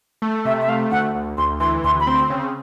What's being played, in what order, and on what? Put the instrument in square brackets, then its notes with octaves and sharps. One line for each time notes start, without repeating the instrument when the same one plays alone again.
[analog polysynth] A3
[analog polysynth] C3 [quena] E5
[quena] E5
[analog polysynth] A3 [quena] F5
[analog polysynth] D2 [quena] F#5
[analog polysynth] D2
[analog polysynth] D2 [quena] C6
[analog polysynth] E3 [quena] C6
[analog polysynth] D2 [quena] C6
[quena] B5
[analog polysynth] C4 [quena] C6
[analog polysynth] C#3